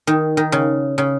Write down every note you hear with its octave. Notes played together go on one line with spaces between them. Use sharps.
D#3
D#3
C#3
C#3